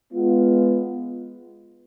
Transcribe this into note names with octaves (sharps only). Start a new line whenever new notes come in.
G#3 B3 F4